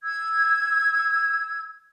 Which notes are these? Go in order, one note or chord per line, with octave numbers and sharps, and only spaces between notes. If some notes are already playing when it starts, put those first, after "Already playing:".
E6 G#6